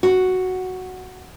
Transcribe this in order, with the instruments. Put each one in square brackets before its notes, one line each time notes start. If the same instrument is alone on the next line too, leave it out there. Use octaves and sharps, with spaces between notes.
[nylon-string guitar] F#4